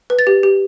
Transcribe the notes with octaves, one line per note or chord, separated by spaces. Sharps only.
B4
A6
G4
G4